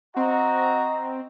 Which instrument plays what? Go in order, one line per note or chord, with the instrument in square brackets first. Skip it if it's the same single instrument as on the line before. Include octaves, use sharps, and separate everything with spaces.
[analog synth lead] C4 [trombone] F#4 [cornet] D#5 [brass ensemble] A#5